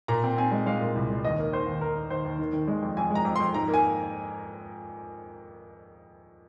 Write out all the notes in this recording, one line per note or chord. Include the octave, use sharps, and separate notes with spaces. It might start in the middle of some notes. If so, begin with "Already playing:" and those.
A#2 A#5
C4
C4 G#5
G#3
G#3 F5
A#2
C2
G#3
D#2 D#5
A#3
D#3 C5
D#2
D#2 A#4
A#3
D#2 C5
D#2
D#3
D#3
G#3
F2
F2 G#5
G#3
A#5
F2
F2 C6
G#2 A#5
A#3
G#5